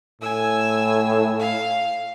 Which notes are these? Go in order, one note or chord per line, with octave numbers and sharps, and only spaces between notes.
A2 G#5 E6
F5